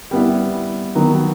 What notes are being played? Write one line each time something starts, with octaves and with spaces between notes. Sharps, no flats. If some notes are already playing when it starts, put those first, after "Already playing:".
G3 B3 E4
D#3 F#3 B3